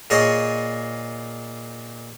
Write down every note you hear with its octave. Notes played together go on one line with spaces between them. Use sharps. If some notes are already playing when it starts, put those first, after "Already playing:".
A#2 G#4 C#5 D#5 A5 C6